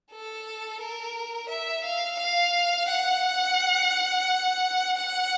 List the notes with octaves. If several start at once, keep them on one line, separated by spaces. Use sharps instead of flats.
A4
A#4
E5
F5
F5
F#5
F#5